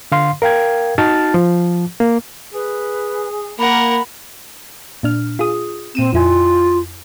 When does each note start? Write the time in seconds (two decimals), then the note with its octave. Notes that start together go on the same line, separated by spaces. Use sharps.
0.12 D3 F5 C6
0.42 A#4 F5 G5 G#6
0.98 D#4 F#4 A5 F6 A6
1.34 F3
2.00 A#3
2.54 G#4 B4
3.59 A#3 A#4 F#5 B5
5.03 A#2 D4 F6
5.39 F4 G#4 D#6
5.95 A#2 C4 D#7 E7
6.14 F2 E4 F4 G#5